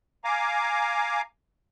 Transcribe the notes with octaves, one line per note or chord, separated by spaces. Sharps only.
F5 G#5 A#5 D6